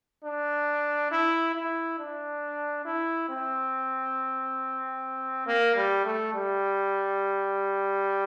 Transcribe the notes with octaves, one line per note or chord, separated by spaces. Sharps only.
D4
E4
E4
D4
E4
C4
A#3
G3
A3
G3